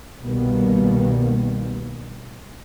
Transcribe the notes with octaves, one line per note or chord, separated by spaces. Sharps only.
C2 B2 D#3 G3 A#3 B3